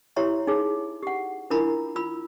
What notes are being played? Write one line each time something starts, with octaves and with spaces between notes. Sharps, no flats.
E4 G4 C#5 E5 A#5 C6
D#4 G#4 C#5
G4 F#5
D4 E4 F4 A#4 A#5 B5
F4 B5 E6